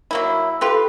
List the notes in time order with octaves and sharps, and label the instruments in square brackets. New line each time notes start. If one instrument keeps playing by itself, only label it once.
[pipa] F#3 A#3 E4
[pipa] F4 G4 B4 [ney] A4